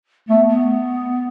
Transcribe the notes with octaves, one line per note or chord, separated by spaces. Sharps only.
A3 B3
B3